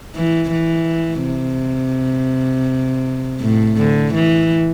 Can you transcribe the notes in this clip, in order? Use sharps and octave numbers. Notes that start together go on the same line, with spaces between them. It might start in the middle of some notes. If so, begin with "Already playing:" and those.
E3
E3
C3
A2
D3
E3